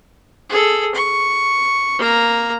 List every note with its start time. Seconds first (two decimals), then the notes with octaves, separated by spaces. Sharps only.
0.50 G#4 A4
0.95 C#6
1.98 A#3 A#5